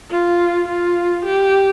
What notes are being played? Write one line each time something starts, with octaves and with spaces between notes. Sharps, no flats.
F4
F4
G4